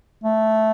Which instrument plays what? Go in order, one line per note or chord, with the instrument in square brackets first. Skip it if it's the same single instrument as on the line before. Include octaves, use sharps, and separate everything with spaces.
[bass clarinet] A3